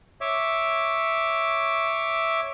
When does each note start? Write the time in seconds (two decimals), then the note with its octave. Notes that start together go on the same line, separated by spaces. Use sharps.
0.21 C#5 E5 D6